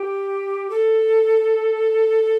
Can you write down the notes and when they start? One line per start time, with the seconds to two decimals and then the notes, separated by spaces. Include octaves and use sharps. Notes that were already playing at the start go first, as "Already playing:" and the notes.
Already playing: G4
0.70 A4